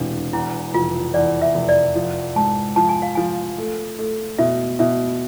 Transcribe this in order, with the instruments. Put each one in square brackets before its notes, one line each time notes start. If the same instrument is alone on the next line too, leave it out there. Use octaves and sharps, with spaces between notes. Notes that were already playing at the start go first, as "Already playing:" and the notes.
Already playing: [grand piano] E1 C3 [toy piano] D4
[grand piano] E2 [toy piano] E4
[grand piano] F1 [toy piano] F4
[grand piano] E2 [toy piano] D5
[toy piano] E5
[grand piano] F1
[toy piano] D5
[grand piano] F3
[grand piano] G#2 [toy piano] A5
[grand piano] F3 [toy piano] A5
[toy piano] G#5
F5
[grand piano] F3 [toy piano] G#5
[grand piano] A3
A3
[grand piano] B2 [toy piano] E5
[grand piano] B2 [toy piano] E5